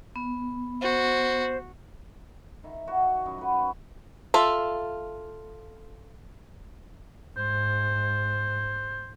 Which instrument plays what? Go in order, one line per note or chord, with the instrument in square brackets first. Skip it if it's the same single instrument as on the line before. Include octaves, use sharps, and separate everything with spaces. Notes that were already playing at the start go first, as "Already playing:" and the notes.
[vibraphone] B3
[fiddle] F#4 [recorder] C5
[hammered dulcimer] D#3 E5
F#4 C#5
F#2
F#4 B4
[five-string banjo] F4 A4 E5
[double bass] G#2 [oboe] C5